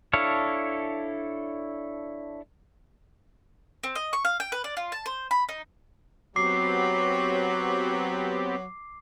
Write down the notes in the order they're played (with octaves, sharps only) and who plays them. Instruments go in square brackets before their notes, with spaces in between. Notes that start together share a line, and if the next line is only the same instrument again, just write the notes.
[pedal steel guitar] D4 E4 A4 C#5 F5
[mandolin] C4
D#5
C#6
F5
G5
B4
D5
F4
A5
C5
B5
D#4
[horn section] F#3 [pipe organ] B3 C4 G4 [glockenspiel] D6 C7